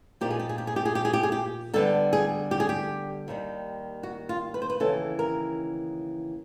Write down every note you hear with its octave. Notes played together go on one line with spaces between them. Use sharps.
A#2 F3 A#3 D#4 G4
G#4
G4
G#4
G4
G#4
G4
G#4
G4
G#4
G4
G#4
G4
D3 G3 B3 D4 A4
G#4
G4
G#4
G4
D#2 D#3 G3
F#4
F4
B4
C5
B4
D#2 C#3 E3 A4
A#4